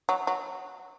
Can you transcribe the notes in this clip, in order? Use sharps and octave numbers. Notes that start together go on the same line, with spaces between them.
F#3
F#3